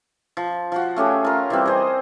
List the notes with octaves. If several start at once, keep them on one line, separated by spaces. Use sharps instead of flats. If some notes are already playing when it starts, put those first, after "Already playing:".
F3
F3 F#4
A3 C#4 G4 G#4
F4 A#4
E3 G3 C4
G#4 C5 D#5